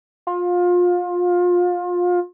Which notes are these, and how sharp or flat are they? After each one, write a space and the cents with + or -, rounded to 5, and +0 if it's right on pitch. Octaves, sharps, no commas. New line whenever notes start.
F4 +25